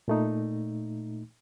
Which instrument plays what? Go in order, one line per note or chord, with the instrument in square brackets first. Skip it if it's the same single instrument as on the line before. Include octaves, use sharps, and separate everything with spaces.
[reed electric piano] A#2 A3 D#4